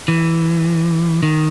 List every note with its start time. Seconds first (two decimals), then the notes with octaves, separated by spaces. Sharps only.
0.08 E3
1.23 D#3